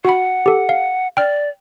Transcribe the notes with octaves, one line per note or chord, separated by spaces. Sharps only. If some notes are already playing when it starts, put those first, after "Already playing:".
F#4 F#5 B5
G4 A4
F5
D5 G5 F6